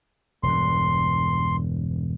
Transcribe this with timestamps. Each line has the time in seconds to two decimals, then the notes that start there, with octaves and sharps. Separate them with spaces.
0.43 E1 G2 C6